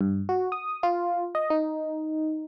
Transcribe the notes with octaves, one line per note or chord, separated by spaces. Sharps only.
G2
F#4
D#6
F4
D#5
D#4